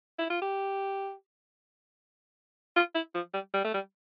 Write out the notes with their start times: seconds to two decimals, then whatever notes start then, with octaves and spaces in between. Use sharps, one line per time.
0.18 E4
0.30 F4
0.42 G4
2.76 F4
2.95 E4
3.14 F3
3.33 G3
3.53 G3
3.64 A3
3.74 G3